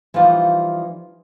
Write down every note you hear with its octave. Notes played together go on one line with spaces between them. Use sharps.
E3 F3 G3 D#4 F4